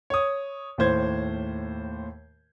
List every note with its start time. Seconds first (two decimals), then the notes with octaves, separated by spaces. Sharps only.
0.10 C#5 D#6
0.78 D#2 A2 C5 G#6